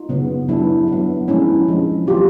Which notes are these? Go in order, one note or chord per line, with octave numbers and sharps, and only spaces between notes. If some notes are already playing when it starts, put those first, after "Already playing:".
Already playing: D#4 F4
C#3 F#3 B3
F#3 B3 D4 E4
F#3 B3
F3 G#3 C#4 D4 E4
F3 G#3 C#4
F#3 B3 F4 G4